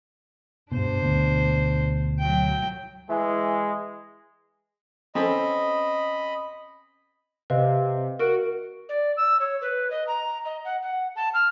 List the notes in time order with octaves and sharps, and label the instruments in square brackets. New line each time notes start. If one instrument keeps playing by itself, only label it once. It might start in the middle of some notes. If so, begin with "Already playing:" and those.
[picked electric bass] G2 B2 [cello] D4 C5
[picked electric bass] D2 B2
[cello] F#3 G5
[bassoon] E3 [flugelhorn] G#3
[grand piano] C4 C#4 A4 [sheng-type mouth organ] D#5 B5
[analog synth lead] C3 [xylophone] B4 D#5 F5
[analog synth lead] F#4 [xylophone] A#4 D7
[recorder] D5
E6
C#5
B4
D#5
A#5
D#5
F#5
F#5
A5
F6